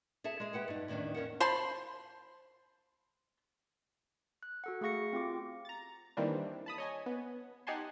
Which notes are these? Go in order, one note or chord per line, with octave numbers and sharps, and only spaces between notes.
G#4 A4 E5 A5
G#3 G#4
G4 B4 F#5 G5
G2 D#4
E2 A2 D#3 C#4 D4
E2 C#4 A#4 F#5
C5 A5 B5 C6
F#6
F#4 A4 F#5
A3 G#4 F5 C#6 A#6 C#7
C4 F4 G4 D6
A#5 A6
D#3 E3 G3 A#3 C4 D4
A5 B5 D#6
C#5 D#5 G#5
B3
D#4 G4 F#5 G#5 A5 C6